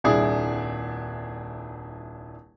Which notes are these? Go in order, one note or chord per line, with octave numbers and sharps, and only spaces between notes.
D#1 C2 D4 E4 G#4 D5